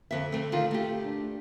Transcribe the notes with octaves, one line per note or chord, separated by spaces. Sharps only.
F2 D3 E5
A3 C4
D#3 F4
A3 G4
D4